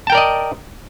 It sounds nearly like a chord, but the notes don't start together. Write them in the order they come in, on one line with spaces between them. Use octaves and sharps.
A5 G5 A#4 D5 D#5